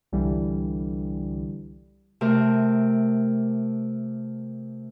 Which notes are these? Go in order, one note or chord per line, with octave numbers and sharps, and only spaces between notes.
C2 D3 E3 G3
C3 A3 A#4